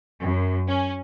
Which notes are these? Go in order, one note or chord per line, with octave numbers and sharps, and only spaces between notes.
F#2
C#4